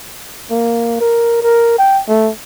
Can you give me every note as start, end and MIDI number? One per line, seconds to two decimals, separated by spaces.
0.51 0.98 58
1.00 1.40 70
1.42 1.74 70
1.78 2.01 79
2.08 2.31 57